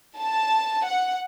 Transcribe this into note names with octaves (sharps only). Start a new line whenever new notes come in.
A5
F#5